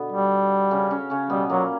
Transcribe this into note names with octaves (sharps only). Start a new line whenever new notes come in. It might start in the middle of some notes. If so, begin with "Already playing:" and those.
Already playing: B2 D3 B3
G3
C#3 C#4
C#3 C#4
C#3 C#4
B2 G3 B3
A#2 F#3 A#3